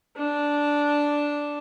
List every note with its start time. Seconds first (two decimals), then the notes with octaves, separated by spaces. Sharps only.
0.17 D4